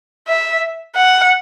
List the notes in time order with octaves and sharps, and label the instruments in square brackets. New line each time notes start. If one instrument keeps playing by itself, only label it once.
[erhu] E5
F#5